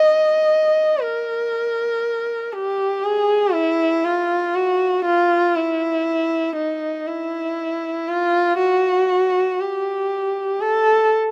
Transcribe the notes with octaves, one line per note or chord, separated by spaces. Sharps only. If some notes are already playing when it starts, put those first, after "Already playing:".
Already playing: D#5
A#4
G4
G#4
E4
F4
F#4
F4
E4
D#4
E4
F4
F#4
G4
A4